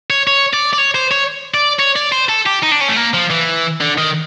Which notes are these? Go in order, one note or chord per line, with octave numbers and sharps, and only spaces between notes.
C#5
C#5
D5
D5
C#5
C5
C#5
D5
C#5
D5
C5
A4
G4
D#4
D4
C#4
A3
A#3
F3
E3
D3
D#3